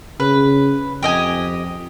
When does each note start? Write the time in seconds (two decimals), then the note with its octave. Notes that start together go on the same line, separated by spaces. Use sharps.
0.20 C#3 B4
1.03 F2 G4 D#5 G#5